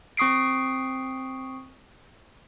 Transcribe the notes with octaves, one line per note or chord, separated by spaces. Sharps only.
C4 C#6 D#6 C7 D7